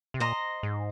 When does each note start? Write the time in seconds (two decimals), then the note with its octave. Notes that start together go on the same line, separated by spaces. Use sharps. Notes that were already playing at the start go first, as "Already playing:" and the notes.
0.14 C3
0.20 A#2 C5 D#5 A#5
0.63 G#2